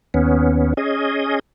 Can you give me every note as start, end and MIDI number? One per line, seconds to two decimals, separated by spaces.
0.14 0.74 39
0.14 0.74 59
0.14 0.74 61
0.77 1.39 61
0.77 1.39 68
0.77 1.39 75